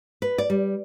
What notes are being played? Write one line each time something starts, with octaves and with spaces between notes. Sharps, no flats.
B4
D5
G3